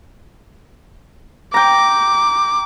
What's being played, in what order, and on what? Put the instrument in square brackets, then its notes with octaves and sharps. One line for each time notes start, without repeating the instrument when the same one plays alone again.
[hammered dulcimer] G5 A#5 [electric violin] D6